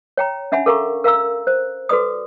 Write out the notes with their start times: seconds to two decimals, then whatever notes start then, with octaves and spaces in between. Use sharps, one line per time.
0.17 C#5 G5 A#5
0.52 C#4 D4 E5 F#5 G#5 B5
0.66 A4 A#4 F5 A#5 C#6
1.04 A#4 F5 A#5 E6
1.47 C5
1.89 F#4 A4 B4 D5 B5 D#6